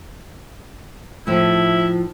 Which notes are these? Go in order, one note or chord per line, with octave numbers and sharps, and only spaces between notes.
A2 F3 E4